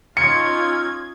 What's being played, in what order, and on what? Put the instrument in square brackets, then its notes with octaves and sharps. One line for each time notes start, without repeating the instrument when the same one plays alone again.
[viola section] C#4 D#4 F4 [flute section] C6 E6 F6 [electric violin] G#6 [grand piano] C#7